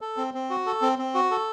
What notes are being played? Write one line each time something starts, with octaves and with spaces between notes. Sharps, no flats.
A4
C4
C4
F#4
A4
C4
C4
F#4
A4